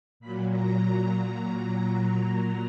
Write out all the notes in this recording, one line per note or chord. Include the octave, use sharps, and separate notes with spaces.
A#2 F#3 B5
A#5
A#5
A#5